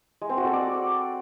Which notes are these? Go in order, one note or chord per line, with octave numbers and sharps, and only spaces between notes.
G#3
C4
F#4
A4
D5